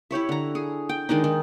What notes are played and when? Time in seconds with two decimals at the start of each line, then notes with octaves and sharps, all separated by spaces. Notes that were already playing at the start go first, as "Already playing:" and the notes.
0.11 E4 G4 C#5 E5
0.29 D3 A#5
0.55 G#4
0.89 G5
1.09 D#3 G#3 D4 D#4
1.24 D#3